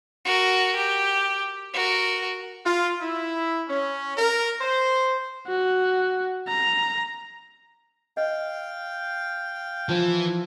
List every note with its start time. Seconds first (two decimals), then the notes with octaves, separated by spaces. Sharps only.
0.25 F#4 A#4
0.76 G4
1.74 F#4 A#4
2.64 F4
3.01 E4
3.69 C#4
4.17 A#4
4.60 C5
5.47 F#4
6.48 A#5
8.17 D#5 F5 G5
9.89 E3 F3